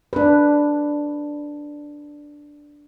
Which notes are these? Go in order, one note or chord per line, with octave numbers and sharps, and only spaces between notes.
D4 B4